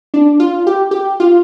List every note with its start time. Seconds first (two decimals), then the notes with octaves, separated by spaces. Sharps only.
0.14 D4
0.40 F4
0.67 G4
0.91 G4
1.20 F4